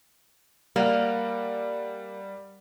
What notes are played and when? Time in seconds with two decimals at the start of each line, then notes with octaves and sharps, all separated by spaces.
0.76 G3 A#3 D5 F#5